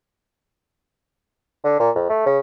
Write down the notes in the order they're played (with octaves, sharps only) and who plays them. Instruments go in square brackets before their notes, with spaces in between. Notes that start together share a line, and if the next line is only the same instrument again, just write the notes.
[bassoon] D3
A#2
F2
A3
C#3